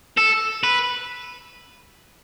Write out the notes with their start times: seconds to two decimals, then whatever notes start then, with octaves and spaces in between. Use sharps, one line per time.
0.17 A4
0.63 B4